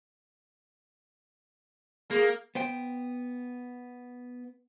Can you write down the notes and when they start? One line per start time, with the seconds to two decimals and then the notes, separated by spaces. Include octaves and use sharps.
2.11 A#3 G#4
2.55 B3 C5 G5